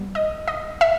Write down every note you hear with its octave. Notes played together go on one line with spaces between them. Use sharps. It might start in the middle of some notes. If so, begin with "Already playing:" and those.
Already playing: G3 B3
D#5
D#5
E5